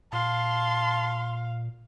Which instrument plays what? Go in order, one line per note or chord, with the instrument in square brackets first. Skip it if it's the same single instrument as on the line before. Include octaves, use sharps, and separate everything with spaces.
[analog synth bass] A#2 [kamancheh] F5 [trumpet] A5 [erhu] C6